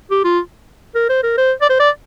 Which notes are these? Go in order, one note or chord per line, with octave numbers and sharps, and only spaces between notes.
G4
F4
A#4
C5
A#4
C5
D5
C5
D5